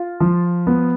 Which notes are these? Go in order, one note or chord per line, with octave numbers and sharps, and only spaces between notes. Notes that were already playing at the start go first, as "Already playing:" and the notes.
Already playing: F4
F3
B3